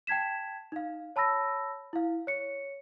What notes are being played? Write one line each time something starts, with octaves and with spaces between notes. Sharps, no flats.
G5 A5 G#6 B6 E7
D#4 F5
C#5 A5 B5 E6 A#6
E4 F5
C#5 C#7